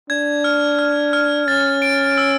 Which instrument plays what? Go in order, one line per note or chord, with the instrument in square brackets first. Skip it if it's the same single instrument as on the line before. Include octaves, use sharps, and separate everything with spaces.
[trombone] D4 [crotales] G#6
[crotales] F6
F6
F6
[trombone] C#4 [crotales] A6
[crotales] D7
E6